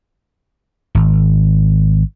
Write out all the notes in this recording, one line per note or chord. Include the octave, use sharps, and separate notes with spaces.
G#1